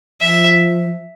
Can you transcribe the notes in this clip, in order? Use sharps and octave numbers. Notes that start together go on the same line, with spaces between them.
F3 E5